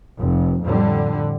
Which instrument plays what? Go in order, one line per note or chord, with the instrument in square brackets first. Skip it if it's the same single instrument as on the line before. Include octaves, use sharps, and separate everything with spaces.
[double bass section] F1
F2 A2 D3 G3